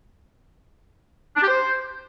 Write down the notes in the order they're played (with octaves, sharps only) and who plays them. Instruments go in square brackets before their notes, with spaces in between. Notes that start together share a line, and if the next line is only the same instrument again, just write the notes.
[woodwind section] D4
G4
C5